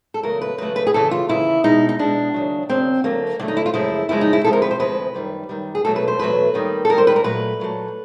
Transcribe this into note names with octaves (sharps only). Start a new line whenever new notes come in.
A4
E2 C#3 F#3 A3 A#4
B4
E2 C#3 F#3 A3 B4
B4
G#4
D#2 C#3 E3 A4
F4
D#2 C#3 E3 E4
B2 G#3 D#4
D#4
B2 G#3 D4
D#2 C#3 F#3
D#2 C#3 F#3 C4
D2 D3 F#3 A3 A#3
D2 D3 F#3 A3 D4
D#4
E4
F4
F#2 C#3 F3 G#3 E4
F#2 C#3 F3 G#3 E4
D#4
E4
D2 C3 F3 G#3 A4
A#4
B4
C5
D2 C3 F3 G#3 B4
F#2 D#3 G3
F#2 D#3 G3
G#4
E2 B2 F#3 A3 A4
B4
C5
E2 B2 F#3 A3 B4
D#2 D#3 G3
A4
D#2 D#3 G3 A#4
C5
B4
A#4
A#2 F#3 A3 B4
A#2 F#3 A3